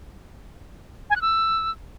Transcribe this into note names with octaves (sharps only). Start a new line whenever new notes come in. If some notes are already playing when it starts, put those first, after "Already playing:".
G#5
F#6
E6